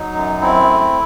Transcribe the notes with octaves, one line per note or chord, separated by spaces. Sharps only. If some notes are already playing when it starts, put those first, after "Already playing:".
Already playing: F#3 D#4
F#2
C4 E4
A3